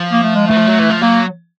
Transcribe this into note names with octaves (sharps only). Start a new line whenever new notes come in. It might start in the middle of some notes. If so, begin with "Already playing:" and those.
Already playing: F3
A#3
A3
G#3
E3 A3
F3
F#3
E3
F3
F#3 A#3